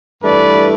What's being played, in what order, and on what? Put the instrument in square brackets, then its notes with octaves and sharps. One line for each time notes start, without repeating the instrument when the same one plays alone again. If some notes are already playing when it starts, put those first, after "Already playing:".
[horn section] G2 E3 A3 B4 D5